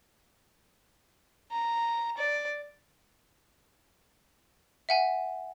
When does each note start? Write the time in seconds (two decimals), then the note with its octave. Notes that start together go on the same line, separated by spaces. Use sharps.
1.52 A#5
2.18 D5
4.89 E5 F#5 G#5